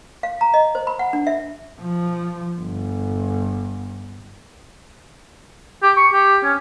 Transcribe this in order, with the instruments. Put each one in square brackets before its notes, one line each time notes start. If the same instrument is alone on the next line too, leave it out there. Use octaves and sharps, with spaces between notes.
[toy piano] F5
A#5
D#5
C5
B5
F#5
D4
E5
[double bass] F3
G1
[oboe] G4
C#6
G4
C#4